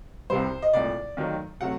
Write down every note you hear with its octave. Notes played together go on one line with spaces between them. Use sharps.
C2 C3 G3 C5
D#5
C2 A#2 A3 D5
D#2 D#3 F#3 A3
C3 F#3 A3 F#5